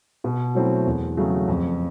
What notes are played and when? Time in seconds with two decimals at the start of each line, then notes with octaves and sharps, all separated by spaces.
0.24 B2
0.55 F#3 A3 C4 E4
0.86 E2
1.17 C#3 F#3 A3
1.48 F2